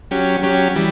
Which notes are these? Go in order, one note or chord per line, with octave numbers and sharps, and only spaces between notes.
F#3 C#4 G4
F#3 C#4 G4
E3 G3